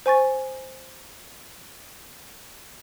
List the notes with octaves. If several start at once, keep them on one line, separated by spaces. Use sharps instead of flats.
C5 G#5 C#6 A6